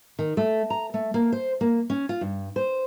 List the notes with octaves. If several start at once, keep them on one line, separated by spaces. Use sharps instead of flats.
D#3
A3
A#5
A3
A#3
C5
A#3
C#4
F4
G2
C5